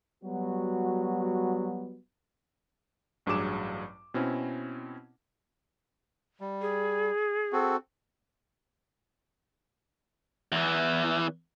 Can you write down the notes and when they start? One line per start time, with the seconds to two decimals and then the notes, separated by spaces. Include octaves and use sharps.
0.23 F#3 G3 B3 F#4
3.26 A1 G2 F#3 G#4 D6 E7
4.14 B2 C4 C#4 E4
6.41 G3
6.61 G#4
7.53 C4 F#4 A4
10.52 E2 E3